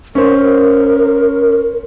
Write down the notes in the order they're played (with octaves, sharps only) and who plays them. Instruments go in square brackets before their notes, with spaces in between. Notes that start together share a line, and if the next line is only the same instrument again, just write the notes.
[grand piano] C#4 C5 [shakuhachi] A#4